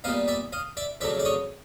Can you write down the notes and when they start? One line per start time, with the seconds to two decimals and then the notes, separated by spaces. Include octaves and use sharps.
0.04 A#2 G3 B3 D#4 D#5 F5
0.28 D5 E5
0.52 D#5 F5
0.77 D5 E5
1.01 F2 C#3 F#3 A3 D5 E5
1.19 D5
1.25 C#5 D#5